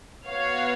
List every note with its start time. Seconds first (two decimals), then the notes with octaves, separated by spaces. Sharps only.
0.28 B3 F#4 C#5 F5